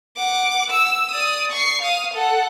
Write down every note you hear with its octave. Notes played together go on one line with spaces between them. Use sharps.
F#5 D6
E6
D5 D#6
C#6 C7
F5 D#6
A4 F#5